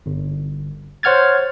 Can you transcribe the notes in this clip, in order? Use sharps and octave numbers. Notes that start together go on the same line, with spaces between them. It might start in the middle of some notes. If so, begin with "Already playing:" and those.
G1
C5 C#5 F#5 F6 G#6 A6